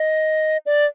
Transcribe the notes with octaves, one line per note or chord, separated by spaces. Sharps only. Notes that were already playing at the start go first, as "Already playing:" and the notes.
Already playing: D#5
D5